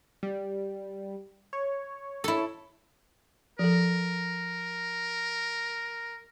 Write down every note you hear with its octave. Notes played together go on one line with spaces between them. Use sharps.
G3
C#5
E4 A4
F3 A4 A#4